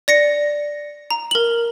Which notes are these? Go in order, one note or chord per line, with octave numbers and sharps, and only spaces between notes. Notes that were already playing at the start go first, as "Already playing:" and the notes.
D5 A#6 C#7
A#5
A#4 F#7